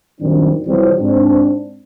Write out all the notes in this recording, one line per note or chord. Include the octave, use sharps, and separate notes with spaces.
F#2 A#2 D#3 G3 C4 D4
C2 F2 E3 F#3 G3 C4
G#2 C4 D4